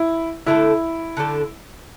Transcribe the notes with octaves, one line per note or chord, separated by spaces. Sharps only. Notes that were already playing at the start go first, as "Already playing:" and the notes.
Already playing: E4
D3 A3 D4 E4 A4
D3 A3 D4 A4